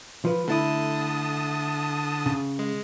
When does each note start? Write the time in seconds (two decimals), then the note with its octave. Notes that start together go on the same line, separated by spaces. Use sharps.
0.25 F3 B4
0.48 D3 A3 E4 A5 D#6
2.26 C#3
2.59 G#3